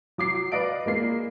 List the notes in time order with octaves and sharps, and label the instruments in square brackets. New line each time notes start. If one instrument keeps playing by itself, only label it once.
[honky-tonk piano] F#3 D6 C7
B4 D5 D#5 F5 D7
G#3 A#3 C7